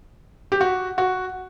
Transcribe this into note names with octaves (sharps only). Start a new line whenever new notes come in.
G4
F#4
F#4